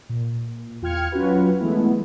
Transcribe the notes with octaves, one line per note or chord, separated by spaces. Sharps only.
A#2
E2 F4 G5 F6 G#6 C#7
F#3 C#4 F4 F#4 B4
E3 G#3 A3 B3 E4